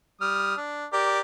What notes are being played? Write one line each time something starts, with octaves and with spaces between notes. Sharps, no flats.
G3 D#6 F6
D4
G4 A#4 D5